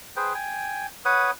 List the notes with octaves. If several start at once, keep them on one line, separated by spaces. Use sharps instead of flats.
G#4 B4 C5 G5
G5 G#5
B4 C#5 F#5 D#6